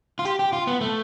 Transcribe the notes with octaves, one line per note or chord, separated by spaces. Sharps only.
F4
G4
G4
F4
B3
A3